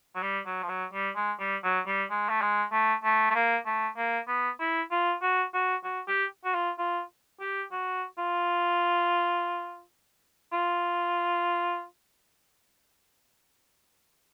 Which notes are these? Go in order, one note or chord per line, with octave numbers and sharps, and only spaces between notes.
F#3
G3
F#3
F3
F#3
G3
G#3
G3
F#3
G3
G#3
A3
G#3
A3
A3
A3
A#3
A3
A#3
B3
E4
F4
F#4
F#4
F#4
G4
F#4
F4
F4
G4
F#4
F4
F4